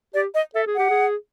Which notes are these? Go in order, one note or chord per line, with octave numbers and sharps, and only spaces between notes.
G4 D5
D#5
A4 E5
G#4
G4 F#5
G#4